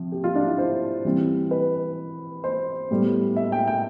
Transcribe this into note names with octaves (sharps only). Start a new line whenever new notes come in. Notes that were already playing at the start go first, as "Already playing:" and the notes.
Already playing: C3 F3
G4
F4
D4
E4
C5
E3 G3 C4
B4
C5
A2 G3 B3
E5
G5
G5